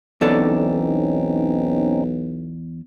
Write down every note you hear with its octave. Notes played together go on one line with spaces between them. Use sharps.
B1 E2 C4 C#4 D#4 A4 D5